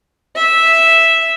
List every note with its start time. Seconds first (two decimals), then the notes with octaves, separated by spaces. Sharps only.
0.36 E5